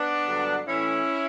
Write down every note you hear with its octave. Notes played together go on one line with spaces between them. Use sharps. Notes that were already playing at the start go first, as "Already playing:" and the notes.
Already playing: B3 D4
G2 D3 F#3
A2 E3 C#4 E4